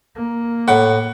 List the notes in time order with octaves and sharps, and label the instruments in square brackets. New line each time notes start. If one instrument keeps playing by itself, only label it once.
[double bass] A#3
[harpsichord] A2 [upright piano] F#5